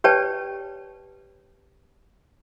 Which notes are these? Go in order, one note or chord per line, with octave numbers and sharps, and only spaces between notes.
G4 B4 C#5 D5 G5 A5